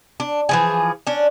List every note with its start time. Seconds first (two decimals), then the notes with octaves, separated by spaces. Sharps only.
0.20 D4
0.49 E3 F3 G#4
1.07 C#4 D4